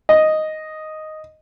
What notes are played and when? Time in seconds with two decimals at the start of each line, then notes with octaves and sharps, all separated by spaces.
0.09 D#5